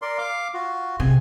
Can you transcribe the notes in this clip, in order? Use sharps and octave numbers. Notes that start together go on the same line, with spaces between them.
A#4 D5 C6
F5 D6
F4 F#4
C3 G#4 G#5